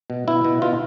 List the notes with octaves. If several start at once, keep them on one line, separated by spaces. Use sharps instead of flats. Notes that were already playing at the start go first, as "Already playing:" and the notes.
B2
B2 E4
B2
B2 F4